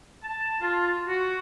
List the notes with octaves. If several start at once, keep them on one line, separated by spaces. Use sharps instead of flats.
A5
F4
F#4